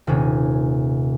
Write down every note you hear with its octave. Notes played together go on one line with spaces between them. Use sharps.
D#1 C3 C#4